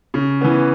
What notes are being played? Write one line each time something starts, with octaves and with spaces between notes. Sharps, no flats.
C#3
E3 B3